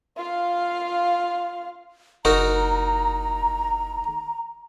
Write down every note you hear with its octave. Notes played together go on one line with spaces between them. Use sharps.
F4 F5
F#1 D#4 F#4 A#4 A#5